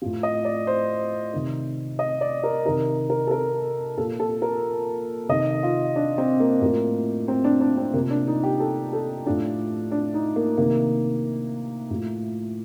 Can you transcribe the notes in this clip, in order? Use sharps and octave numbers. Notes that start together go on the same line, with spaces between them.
A2 F3
D#5
D5
C5
C3 D#3
D#5
D5
A#4
C3 D#3 A#4
A#4
A4
A#4
A#2 F3 A4
A4
A#4
C3 D#3 D#5
F4
D4
C4
A#3
A2 F3 A#3
C4
D4
D4
C4
C3 F3 A#3
D4
D#4
G4
A4
A4
A2 F3 D4
D4
D#4
A#3
C3 D#3 A#3
A2 F3